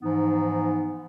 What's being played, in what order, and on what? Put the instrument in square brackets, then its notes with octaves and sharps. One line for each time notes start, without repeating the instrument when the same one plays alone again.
[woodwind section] G#2 E3 F3 B3 D#4